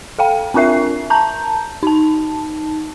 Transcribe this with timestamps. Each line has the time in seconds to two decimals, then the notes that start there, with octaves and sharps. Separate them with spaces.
0.19 A4 F5 G5
0.54 C4 D4 F4 A#4 E5 C7
1.10 A5 A#5 G6
1.83 D#4 A5